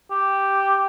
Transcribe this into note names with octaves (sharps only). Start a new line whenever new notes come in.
G4